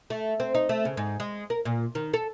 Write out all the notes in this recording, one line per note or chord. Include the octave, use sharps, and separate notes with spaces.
A3
C4
D#4
A3
C#3
G#2
G#3
A#4
A#2
D#3
A4